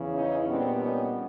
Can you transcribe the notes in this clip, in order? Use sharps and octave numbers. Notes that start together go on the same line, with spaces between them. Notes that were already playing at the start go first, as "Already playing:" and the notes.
Already playing: E2 C#3 E3
C#4 D#4
A#2 G3 B3 C4 D4
C#4 D#4